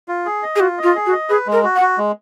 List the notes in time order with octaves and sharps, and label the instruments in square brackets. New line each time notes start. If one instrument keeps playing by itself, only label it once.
[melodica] F4
G#4
D#5
[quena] G#4
[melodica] F4 [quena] F#4
[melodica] D#5
[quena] F4
[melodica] G#4
[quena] F#4
[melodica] D#5
[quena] G#4 [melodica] B4
[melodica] G#3
[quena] A#4
[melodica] F#4
[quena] F#5
[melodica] F#4
G#3